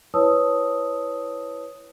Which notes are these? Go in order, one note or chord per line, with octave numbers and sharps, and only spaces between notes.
E4 B4 C#5 A5 D#6 E6